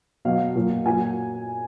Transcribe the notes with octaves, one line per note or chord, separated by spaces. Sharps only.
B2 F#3 F5
A#2 F#3
A#2 F#3 G#5